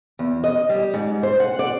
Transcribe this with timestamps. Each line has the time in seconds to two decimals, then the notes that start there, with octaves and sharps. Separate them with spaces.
0.19 E2
0.44 D#5
0.69 G3
0.94 G#2
1.23 C5
1.40 F#5
1.59 D5